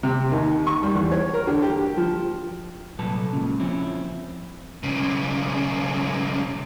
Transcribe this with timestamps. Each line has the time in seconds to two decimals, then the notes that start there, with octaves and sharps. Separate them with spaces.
0.03 C3
0.32 D#2
0.67 C#6
0.83 G3
0.95 E2
1.11 C#5
1.34 A#4
1.47 D3
1.62 G4
1.97 F3
2.98 C2 A#2 F#3 A4 B4 A5
3.33 C#2 A#2 C#3
3.60 F3 C4 C#4 E4
4.83 B1 C#3